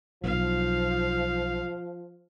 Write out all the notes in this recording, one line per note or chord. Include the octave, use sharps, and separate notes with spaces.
B1 F3 B3 F5